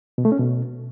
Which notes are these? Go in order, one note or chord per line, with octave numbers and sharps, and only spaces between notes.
B2
A3
C#4
B2